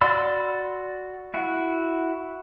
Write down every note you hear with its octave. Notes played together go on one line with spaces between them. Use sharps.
F#4 D5 B5 C6 E6
E4 F#4 F#5